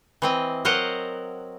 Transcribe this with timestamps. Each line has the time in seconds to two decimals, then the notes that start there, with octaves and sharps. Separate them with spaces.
0.22 E3 C4 D#5
0.65 F#3 A#4 C5 D#5 F#5